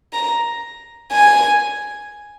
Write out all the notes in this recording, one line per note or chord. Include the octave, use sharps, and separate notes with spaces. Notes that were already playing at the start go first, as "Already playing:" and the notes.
A#5
G#5